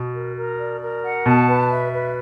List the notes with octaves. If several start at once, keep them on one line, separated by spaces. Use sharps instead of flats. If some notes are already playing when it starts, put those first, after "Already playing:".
Already playing: B2
A#4
A#4
D5
A#4
F#5
B2 A5
B4
E5
B4